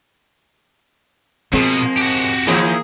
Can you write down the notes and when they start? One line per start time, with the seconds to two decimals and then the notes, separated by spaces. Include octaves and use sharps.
1.53 B2 F3 G#3 A#3 C4
1.98 F#4 G4
2.47 D#3 E3 A#3 E4 G#4